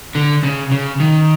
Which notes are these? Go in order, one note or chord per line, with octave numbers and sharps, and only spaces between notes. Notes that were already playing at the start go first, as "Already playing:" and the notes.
D3
C#3
C#3
D#3